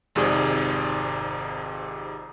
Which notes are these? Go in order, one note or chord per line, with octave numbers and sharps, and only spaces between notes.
G#1 F2 G#2 C3 G#4 D5